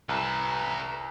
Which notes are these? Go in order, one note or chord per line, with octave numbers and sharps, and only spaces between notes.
C2 A4 B4 A#5